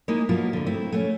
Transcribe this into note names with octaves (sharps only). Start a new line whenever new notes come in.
G#3 A#3 D#4 E4 G#4
B2 F3 F#3 A#3 E4 F4
F2 D3
A3 C4 E4
A3 B3 C#4